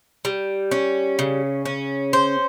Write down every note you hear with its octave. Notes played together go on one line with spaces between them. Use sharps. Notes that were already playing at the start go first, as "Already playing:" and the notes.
G3
C#4
C#3
C#4
C5